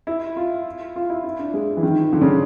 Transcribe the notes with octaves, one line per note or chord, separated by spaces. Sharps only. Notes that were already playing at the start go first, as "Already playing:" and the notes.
E4
F4
F4
E4
E4
D4
G#3
E3
D#3
D3
C#3